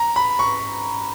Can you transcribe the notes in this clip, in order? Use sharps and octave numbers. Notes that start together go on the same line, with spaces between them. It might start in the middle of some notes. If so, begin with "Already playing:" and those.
Already playing: A#5
B5
C#6